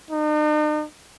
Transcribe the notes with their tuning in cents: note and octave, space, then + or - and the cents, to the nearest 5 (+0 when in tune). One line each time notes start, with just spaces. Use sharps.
D#4 -45